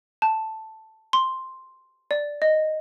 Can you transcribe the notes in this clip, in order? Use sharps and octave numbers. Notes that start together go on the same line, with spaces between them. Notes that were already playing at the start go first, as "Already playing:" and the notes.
A5
C6
D5
D#5